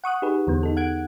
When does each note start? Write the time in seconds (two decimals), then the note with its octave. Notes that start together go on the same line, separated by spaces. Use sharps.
0.04 F#5 C#6 D#6 F#6
0.22 D#4 G4 G#4 B4
0.47 E2 D3 E3 B3
0.63 D#4 A4
0.77 F#5 F#6 G#6 D7